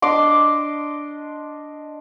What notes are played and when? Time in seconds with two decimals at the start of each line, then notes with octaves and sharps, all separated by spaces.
0.02 D4 D#5 C6 D6